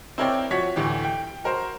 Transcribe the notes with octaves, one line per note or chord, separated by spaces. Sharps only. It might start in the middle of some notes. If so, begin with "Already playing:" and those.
C4 E4 A#4 C#5 D5 G5
F3 F#4 C#5 B6
D2 A2 E3 G4
G5
F#4 A#4 C5 A#5